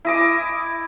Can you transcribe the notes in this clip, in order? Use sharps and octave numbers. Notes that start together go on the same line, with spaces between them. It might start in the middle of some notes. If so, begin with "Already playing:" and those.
E4 D#5 D6